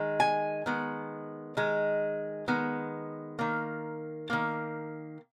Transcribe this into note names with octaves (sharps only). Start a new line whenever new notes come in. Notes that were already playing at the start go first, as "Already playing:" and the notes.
Already playing: D#3 G#3
G#5
D#3 G#3 B3
D#3 G#3
D#3 G#3 B3
D#3 A#3
D#3 A#3